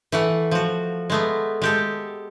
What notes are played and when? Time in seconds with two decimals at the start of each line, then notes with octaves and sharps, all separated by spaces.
0.12 E3 A3 F#5
0.51 F3 F#4
1.10 G#3 A3 B3
1.62 G#3 G4 A4